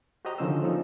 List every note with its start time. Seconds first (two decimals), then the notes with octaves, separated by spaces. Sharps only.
0.25 F#4 G4 C5 D#5 A#5
0.38 D3 D#3 F3 C#4 C5 E6
0.63 F3 A#3 C#4 D#4 A4